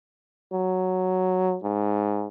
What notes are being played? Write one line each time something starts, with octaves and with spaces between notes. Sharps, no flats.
F#3
G#2